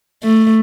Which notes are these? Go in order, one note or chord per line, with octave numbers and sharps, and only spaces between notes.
A3